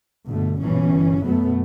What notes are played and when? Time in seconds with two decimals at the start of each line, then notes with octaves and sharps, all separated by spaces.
0.28 G1 B2 D3 A3
0.59 G1 G2 B2 E3 C#4
1.22 F#2 B2 F#3 A3 B3